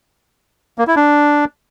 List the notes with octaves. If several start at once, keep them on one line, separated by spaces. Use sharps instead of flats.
A#3
E4
D4